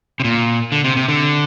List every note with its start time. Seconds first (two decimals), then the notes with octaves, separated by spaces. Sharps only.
0.20 C3
0.24 A#2
0.72 D3
0.84 C3
0.97 C3
1.08 D3